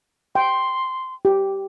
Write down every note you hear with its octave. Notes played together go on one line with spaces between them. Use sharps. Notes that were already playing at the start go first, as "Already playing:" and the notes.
G5 C6
G4